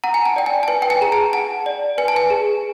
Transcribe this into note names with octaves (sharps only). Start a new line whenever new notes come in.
F#5 A#5
G#5
A5
D5 G5
G#5
A5
B4 G#5
G5
G#5
G#4 A#5
A5
F#5 A5
D5
B4 G#5
A5
G#5
G#4